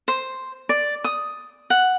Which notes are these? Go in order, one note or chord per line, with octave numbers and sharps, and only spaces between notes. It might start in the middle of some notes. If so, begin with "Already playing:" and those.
C5
D5
D#6
F#5